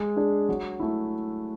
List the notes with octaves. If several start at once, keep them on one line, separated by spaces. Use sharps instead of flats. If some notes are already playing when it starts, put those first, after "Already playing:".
Already playing: G#3
D4 G#4
F#3
A3 E4